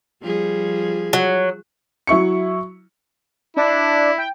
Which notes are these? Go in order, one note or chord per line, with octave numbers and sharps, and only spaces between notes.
F3 G3 G#4
F#3
F#3 E4 C#6 C#7
D4 E4
G5